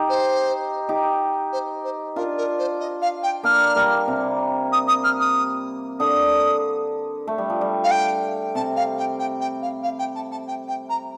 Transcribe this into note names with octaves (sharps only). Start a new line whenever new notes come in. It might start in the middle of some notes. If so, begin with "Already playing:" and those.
Already playing: D#4 G4
C5
D#4 G4
C5
C5
D4 F4 A#4
A#4
C5
D#5
F5
G5
A#3 D4 F6
G3 A#3
C3
D#6
D#6
F6
D#6
D3 D#6
A3
G3
F3
G3
F5
G5
C3 A5
F5
G5
G5
G5
F5
F5
G5
A5
A5
G5
G5
A#5